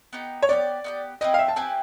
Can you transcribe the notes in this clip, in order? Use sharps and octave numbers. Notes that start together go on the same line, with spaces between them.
B3 D#4 G4
C#5
B3 D#4 G4 D5
B3 D#4 G4
C4 E4 G4 B4 D#5
F5
E5
A5
C4 E4 G4 B4 G#5